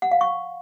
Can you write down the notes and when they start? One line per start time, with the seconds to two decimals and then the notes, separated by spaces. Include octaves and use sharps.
0.02 F#5
0.12 F5
0.21 C#6